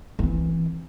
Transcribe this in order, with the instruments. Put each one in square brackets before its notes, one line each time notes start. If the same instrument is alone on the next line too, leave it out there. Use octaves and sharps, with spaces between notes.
[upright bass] E3 C4